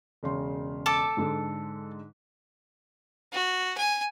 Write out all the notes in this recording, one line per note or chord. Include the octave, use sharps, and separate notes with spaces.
E1 C#3 C6
A4 A5 D6
G#2 D3 G#3
F#4
G#5